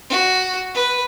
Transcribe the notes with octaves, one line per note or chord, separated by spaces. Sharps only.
F#4
B4